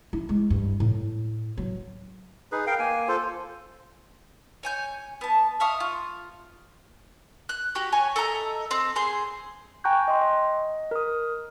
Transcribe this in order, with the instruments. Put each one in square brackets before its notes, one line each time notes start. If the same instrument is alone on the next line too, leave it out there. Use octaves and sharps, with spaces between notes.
[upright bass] E4
G#3
G2
A2
F#3
[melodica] D#4 G#4 B4
A#4 F5 G5
A#3 G#5
F4 A4 C5
[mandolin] C#5 G#5 G6
B3 A5
E5 F5 C#6 D#6
F4
F#6
F#4 G4
C#5 G#5 C#6
A4 D#5 E5 A#5
C4
G#4 C5 C6
[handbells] G5 G#5 A#5 C#6 F#6 G6
D#5 C6
D#5
A#4 D#6